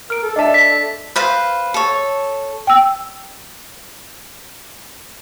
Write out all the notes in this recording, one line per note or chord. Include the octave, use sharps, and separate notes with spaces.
A#4 F6 D7
A4
D4 D#5 E5 A5
B6
B4 C5 F5
A4 C#5
G5 E6